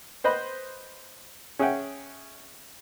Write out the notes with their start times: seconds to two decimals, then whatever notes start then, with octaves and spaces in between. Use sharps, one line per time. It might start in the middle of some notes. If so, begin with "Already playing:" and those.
0.24 B4 C5 D#5 B5
1.59 C#4 G#4 E5 F#5 G5